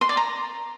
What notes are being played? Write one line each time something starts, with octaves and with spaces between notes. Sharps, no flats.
C6
D5
A#5